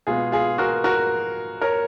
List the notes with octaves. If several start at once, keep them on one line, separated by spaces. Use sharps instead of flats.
B2 G#3 B3 F4 G#4
F4 G#4
F#4 A#4
F#4 A#4
A#4 C#5